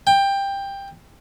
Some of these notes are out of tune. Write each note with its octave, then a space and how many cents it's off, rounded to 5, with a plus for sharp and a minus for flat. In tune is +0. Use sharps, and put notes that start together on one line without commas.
G5 +15